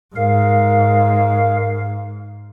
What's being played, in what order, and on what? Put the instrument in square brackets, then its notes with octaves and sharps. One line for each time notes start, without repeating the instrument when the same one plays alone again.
[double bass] G#2 [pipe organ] A#4 F5